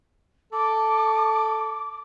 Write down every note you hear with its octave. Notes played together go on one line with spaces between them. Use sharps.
A4 D6